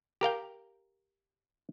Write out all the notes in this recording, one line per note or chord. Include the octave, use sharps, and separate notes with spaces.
G4 A#4 F5 G5